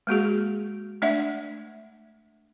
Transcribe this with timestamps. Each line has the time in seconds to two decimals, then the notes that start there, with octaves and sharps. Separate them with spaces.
0.07 G#3 A#3 F#4 G#4
1.02 A3 D4 D5 E5 F#5